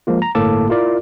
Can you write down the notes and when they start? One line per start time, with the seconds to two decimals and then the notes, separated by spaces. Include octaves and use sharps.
0.07 F3 G#3 A#3 F4
0.22 A#5
0.35 G1 A2 A#3 A4 A5 D6
0.69 E4 F4 A#4 D5